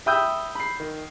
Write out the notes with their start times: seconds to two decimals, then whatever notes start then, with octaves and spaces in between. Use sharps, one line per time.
0.06 E5 G5 B5 D#6 E6 G6
0.55 B5 C7
0.80 D#3